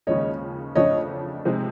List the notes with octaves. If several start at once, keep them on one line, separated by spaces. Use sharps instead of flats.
D#2 C#3 F3 G#3 C#4 C#5 D#5
F2 C#3 F3 A3 D4 C#5 D#5
C3 F3 G#3 C4 D#4